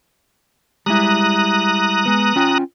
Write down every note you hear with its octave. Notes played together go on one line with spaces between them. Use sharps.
G3 G#3 E4 A#5 D#6 F#6
G#3 B3
C#4 F4 G5